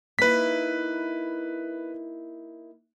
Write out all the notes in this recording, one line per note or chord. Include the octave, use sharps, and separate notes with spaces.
A#3 D#4 E4 B4 B6